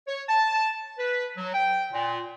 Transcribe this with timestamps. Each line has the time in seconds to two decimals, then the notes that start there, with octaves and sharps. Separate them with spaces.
0.07 C#5
0.27 A5
0.98 B4
1.36 F#3
1.53 G5
1.92 A#2